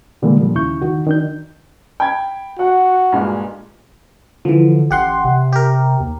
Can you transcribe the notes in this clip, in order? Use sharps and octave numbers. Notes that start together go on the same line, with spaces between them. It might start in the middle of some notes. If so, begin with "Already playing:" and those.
A#2 D3 E3 G3 G#3 A#3
A#2 F3 G3
D#2 C#3 E4 C#6 G6
D#3 F#4
D#3 D4 G6
G5 B5 G#6
F#4 F#5
G2 A#2 G#3
D3 E3 F3
A1 G4 F#5 C6
C3
G4 A#4
D#2